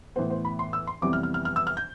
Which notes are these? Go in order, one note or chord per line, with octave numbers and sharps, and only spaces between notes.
A2 E3 B3 C5
C5
B5
C6
E6
C6
F2 C3 E3 G3 B3 D6
F6
F6
F6
F6
E6
F6
G6